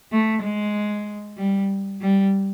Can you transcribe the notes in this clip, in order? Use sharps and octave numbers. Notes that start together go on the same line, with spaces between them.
A3
G#3
G3
G3